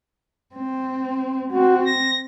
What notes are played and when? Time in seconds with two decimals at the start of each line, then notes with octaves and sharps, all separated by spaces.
0.55 C4
1.52 C4 F#4
1.86 A#6